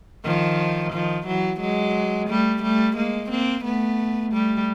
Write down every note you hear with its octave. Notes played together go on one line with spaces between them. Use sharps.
D#3 F3
D#3 F3
E3 F#3
F#3 G#3
G3 A3
G3 A3
G#3 A#3
A#3 C4
A3 B3
G3 A3